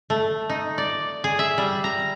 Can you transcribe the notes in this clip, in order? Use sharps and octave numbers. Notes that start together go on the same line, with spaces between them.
A3
D#4
D5
G#4
E5
G3
A#5